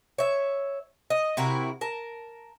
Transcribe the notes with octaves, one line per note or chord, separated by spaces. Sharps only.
C#5 E5
D#5
C3 E4 F#4 A#4
A#4 A5